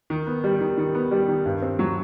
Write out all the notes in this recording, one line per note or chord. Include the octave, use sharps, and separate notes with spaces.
D#3
B3
G3
D#3
D#3
B3
G3
D#3
G2
C4
F#3